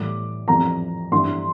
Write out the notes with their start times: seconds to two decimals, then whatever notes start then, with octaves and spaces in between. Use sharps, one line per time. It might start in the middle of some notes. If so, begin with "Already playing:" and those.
Already playing: A2 E3 G3 D6
0.48 F2 E3 G3 A#5
1.12 G2 E3 G3 C6